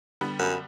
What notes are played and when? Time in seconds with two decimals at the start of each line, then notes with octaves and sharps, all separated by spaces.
0.21 D3 G3 B3
0.39 F#2